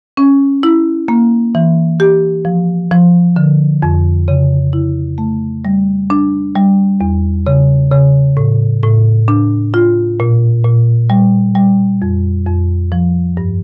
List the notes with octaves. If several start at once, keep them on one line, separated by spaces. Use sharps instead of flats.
C#4
E4
A#3
E3
G4
F3
F3
D3
F2
C#3
E4
A3
G3
D4
G3
E2
C#3
C#3
A2
A2
D4
F4
A#2
A#2
G3
G3
F2
F2
F3
G2